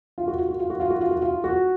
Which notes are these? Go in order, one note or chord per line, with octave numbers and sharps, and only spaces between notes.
F4
F#4
F4
F#4
F4
F#4
F4
F#4
F4
F#4
F4
F#4